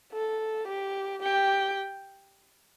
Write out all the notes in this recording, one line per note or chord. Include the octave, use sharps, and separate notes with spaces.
A4
G4
G4 G5